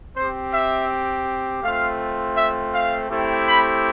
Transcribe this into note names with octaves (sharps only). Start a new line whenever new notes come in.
C4 G4 C5
E5
A3 C4 F4 F5
E5
F5
A3 C4 E4 G4
B5